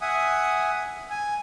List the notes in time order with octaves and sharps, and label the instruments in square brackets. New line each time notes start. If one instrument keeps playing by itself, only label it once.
[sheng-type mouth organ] E5 F#5 G#5 D#6
G#5